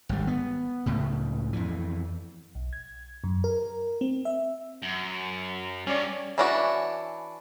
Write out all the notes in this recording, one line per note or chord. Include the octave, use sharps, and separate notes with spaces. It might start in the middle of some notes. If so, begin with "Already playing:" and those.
G#1 G3
B3
C#2 A2 C#3
F2 E3
B1
G#6
F#2
A#4
C4
E5
F#2
G2 C#4 D5
E3 C#4 D4 E4 F#4